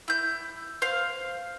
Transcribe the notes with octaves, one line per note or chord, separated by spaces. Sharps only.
E4 G6
C5 F5